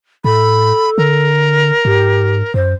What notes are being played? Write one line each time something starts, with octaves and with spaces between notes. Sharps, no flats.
A2 A4 B5
D3 A#4
G#2 G4
F#2 C5